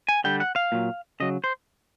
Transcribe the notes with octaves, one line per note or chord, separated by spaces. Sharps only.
G#5
D3 G3 G5
F#5
F5
A#2 F#3
C#3 F#3 D#5
C5